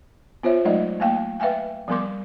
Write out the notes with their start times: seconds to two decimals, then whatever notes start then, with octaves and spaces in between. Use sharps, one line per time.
0.43 B3 F4 C5 C#5 E5
0.65 F#3 G#3 A3 D#4 D5 D#5
1.00 A3 A#3 F5 G5
1.40 B4 E5 F5 G5 G#5
1.88 F3 G3 B3 A#4 C6 D6